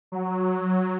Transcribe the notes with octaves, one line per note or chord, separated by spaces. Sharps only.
F#3